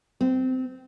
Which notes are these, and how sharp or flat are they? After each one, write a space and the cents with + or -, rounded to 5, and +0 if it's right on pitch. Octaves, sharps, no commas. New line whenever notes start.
C4 -20